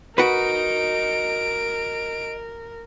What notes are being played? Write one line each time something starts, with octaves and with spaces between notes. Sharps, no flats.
F#4 A#4 B4 D#5 A#5 D7